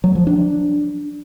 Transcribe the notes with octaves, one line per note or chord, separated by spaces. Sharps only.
F#3
F3
D4